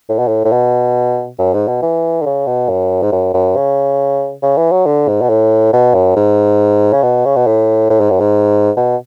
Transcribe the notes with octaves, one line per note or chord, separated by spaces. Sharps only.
A2
B2
A2
A2
B2
F#2
G#2
B2
E3
D3
C#3
B2
F#2
G#2
F#2
F#2
C#3
C#3
E3
F#3
D3
G#2
B2
A2
B2
F#2
G#2
C#3
B2
C#3
B2
A2
A2
G#2
F#2
G#2
B2